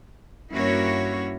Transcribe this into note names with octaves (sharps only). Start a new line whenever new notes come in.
G2 A#3 C#4 E4 F#4 C#5